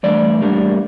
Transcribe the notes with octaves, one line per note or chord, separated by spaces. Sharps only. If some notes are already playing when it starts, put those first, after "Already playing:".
G2 E3 A3 D4 D5
A2 G3 A#3 D4